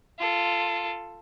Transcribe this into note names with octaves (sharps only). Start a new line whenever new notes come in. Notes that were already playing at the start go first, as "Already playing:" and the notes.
F4 A4